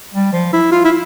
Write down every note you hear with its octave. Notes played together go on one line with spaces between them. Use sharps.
G3
F3
E4
F4
E4